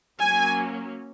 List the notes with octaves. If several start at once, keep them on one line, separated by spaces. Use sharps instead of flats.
F#3 A#3 C#4 G#5